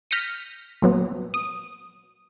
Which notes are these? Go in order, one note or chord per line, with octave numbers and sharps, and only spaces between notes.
F6 G6 A#6 B6 C#7 D#7
A#2 F#3 B3
D#6